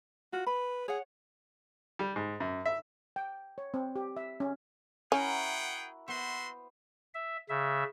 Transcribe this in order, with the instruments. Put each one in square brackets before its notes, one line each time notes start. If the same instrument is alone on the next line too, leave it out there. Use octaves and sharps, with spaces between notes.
[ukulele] F4 [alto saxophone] F#4
[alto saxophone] B4 [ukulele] B5
[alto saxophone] G#4 [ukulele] C#5 F#5
[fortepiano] G3
G#2
F#2
E5
[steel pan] G5
C#5
C4
G4
E5
C#4
[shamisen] C#4 [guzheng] E4 F#4 A#4 [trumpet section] G#4 F#5 G5
[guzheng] B3 C5 [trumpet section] F#4 E5 C6
[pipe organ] E5
C#3 E5